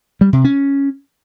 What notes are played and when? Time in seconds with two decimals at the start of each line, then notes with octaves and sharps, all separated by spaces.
0.21 G3
0.33 C3
0.44 C#4